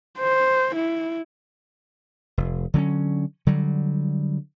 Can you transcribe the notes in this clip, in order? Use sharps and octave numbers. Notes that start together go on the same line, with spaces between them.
C5
E4
F1
D3 F#3 A#3 C#4
D3 F#3 G3